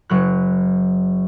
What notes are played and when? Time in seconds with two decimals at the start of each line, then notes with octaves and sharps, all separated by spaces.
0.09 F#1 F#3 F#6